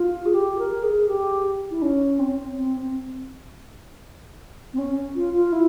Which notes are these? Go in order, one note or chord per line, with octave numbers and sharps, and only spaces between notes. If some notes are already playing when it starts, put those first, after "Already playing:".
Already playing: F4
G#4
G4
A#4
G#4
G4
E4
C#4
C4
C4
C4
C4
C#4
F4
F4
E4